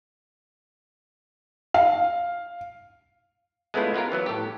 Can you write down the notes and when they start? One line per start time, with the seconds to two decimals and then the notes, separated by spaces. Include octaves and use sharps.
1.74 F5
3.74 G#3 A3 B3 C#4 E4 F4
3.94 B3 F4 G4 A#4
4.12 E3 F#3 B3
4.26 A2 G4